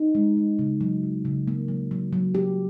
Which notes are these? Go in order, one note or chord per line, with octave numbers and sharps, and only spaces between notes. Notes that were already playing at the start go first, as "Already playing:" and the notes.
Already playing: D#4
G#3
G#3
C#3
F#3
C#3
C#3
A#3
F#3
F#3
F#3
G4